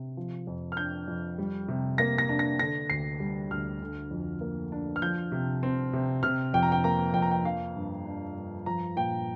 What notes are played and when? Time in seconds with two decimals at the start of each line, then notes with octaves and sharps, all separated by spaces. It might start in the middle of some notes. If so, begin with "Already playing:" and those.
Already playing: C3
0.17 F3
0.47 F2
0.72 F6
0.77 D4 G6
1.08 F2
1.38 G3
1.68 C3
1.98 A#3 A#6
2.18 A#6
2.29 D4
2.39 A#6
2.59 D3 A#6
2.90 D2 C7
3.20 G3
3.51 D2 F6
3.81 D3
4.11 F2
4.41 A#3
4.72 D4
4.96 F6
5.02 F3 G6
5.32 C3
5.63 C4
5.93 C3
6.23 C3 F6
6.54 F2 G5
6.63 A#5
6.72 G5
6.84 A#3 A#5
7.14 F2 G5
7.22 A#5
7.31 G5
7.45 F3 F5
7.76 G2
8.05 D4
8.36 G2
8.66 F3 A#5
8.96 A#2 G5